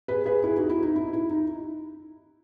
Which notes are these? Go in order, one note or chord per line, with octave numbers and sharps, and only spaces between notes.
G#4 B4
G#4 B4
E4 G#4
D#4 F#4
E4
D#4
E4
E4
D#4